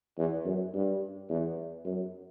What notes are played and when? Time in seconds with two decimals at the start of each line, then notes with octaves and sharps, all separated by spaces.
0.18 E2
0.45 F#2
0.74 G2
1.30 E2
1.85 F#2